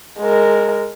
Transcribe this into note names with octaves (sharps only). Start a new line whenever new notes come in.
G#3 A#4